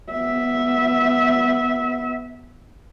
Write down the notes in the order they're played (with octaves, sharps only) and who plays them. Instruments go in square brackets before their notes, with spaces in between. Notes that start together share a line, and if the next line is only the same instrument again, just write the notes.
[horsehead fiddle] B3 E5